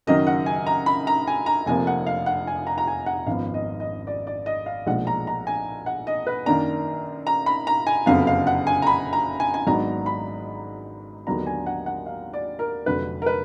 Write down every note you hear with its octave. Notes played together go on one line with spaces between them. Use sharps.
F#1 F#2 D#3 F#3 D#5
F#5
G#5
A#5
B5
A#5
G#5
A#5
F1 F2 F3 A#3 G#5
F#5
F5
F#5
G#5
A#5
A#5
G#5
F#5
G#1 F#2 F3 B3 F5
D#5
D#5
D5
D5
D#5
F5
B1 A#2 F3 G#3 D4 F#5
A#5
A#5
G#5
F#5
D#5
B4
F#2 D#3 A#3 D4 A#5
A#5
B5
A#5
G#5
F#1 F2 D3 F#3 B3 F5
F5
F#5
G#5
A#5
B5
A#5
G#5
G#5
G#1 G#2 F#3 B3 D4 A#5
B5
D#2 D3 F#3 B3 D4 A#5
G#5
F#5
F#5
F5
D5
A#4
F1 F2 D3 F#3 B4
A#4
B4